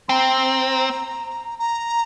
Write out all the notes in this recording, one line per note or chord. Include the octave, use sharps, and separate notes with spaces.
C4 A#5 C6
A#5